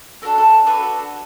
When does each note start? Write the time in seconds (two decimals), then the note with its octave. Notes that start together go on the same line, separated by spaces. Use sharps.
0.22 D4 F#4 A4 A#4
0.38 A4
0.66 D4 F#4 A4 B4